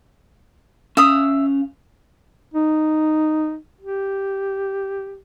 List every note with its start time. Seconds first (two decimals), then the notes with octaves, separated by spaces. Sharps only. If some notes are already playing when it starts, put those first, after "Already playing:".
0.97 C#4 E5 F5 D#6
2.54 D#4
3.81 G4